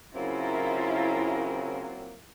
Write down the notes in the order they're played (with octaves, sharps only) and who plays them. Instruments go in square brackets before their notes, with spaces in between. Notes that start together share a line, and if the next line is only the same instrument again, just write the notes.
[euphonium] C#3 [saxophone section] F#3 A#3 C4 [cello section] E4 F4 A#4